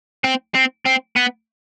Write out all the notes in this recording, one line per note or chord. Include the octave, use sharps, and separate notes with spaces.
C4
C4
C4
B3